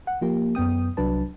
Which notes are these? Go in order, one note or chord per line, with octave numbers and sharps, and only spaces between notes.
F#5
F3 A#3 G4
F#2 B3 G5 D#6
C2 F#3 D4 B4 A5